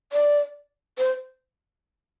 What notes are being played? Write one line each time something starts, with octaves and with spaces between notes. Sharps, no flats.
D5
C5